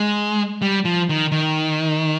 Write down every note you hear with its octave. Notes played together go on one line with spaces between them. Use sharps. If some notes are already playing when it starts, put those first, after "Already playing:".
Already playing: G#3
G3
F3
D#3
D#3